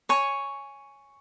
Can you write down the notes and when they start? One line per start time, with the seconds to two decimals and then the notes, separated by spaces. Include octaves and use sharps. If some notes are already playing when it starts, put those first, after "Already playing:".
0.09 C#5 G#5 C#6